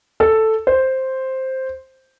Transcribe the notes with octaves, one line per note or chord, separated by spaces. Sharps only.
A4
C5